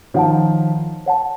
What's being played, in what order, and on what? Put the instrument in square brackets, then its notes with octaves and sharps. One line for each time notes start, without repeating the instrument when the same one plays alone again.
[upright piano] D#3 F3 [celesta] C#5 F#5 A5
[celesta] C#5 F#5 A5